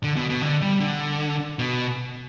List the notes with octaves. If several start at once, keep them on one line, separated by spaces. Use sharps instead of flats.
D3
B2
B2
D3
G3
D3
B2